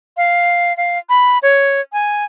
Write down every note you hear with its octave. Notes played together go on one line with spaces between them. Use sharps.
F5
F5
B5
C#5
G#5